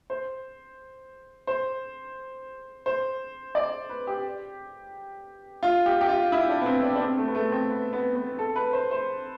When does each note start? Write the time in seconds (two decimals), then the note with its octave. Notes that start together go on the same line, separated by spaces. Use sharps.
0.10 C5
1.47 C5
2.86 C5
3.55 D5
3.89 B4
4.07 G4
5.63 F4
5.86 G4
6.01 G4
6.09 F4
6.32 E4
6.49 D4
6.62 B3
6.66 C4
6.83 D4
6.96 D4
7.01 C4
7.17 A3
7.28 B3
7.35 A3
7.52 C4
7.70 B3
7.93 B3
8.15 B3
8.39 A4
8.56 B4
8.73 C5
8.91 C5